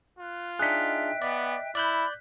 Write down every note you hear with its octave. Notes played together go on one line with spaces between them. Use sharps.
F4 F#6
D4 D#4 G#4 D#5 E5 G5 F#6 B6
B3 D5
E4 D5 B5 F#6 G6